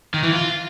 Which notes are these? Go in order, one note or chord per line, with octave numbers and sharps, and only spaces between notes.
D#3
E3
F4